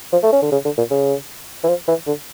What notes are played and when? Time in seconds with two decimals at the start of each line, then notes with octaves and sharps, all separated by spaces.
0.13 F3
0.23 A3
0.32 C#4
0.42 D3
0.52 C#3
0.65 D3
0.78 A#2
0.91 C#3
1.64 E3
1.68 F3
1.88 E3
2.07 D3